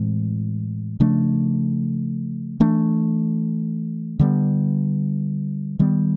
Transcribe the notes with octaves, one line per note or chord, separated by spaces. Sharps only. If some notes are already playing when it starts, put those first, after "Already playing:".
Already playing: A2 E3 G#3 C4
C#3 F3 A3 D4
E3 A3 D4
D3 G3 B3
D#3 G3 B3